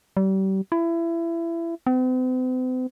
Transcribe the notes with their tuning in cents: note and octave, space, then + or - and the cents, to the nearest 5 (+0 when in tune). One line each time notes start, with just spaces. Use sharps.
G3 -35
E4 +25
C4 -45